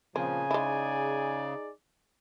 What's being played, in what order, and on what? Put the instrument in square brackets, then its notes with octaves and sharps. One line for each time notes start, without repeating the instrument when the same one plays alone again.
[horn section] A#2 F3 [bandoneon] C#3 [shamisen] C4 [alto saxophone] G#5
[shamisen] G#3 E4 [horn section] D#4 G#4 D5